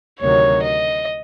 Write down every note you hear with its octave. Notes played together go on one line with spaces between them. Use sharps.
D2 C3 D#3 F#3 C#5
D#5